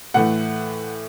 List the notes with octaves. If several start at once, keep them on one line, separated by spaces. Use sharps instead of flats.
A2 E3 A3 F#5